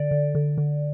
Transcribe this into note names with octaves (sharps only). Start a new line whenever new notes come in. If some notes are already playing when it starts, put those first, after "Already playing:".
Already playing: D3 D5
D3
D3
D3